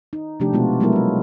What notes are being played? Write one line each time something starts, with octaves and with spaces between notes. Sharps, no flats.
D#4
C3 F3 A3 D4 G4
B2 G#3 B3 F4 F#4
F#3 G#3 A3 B3 E4 A#4
G3 F4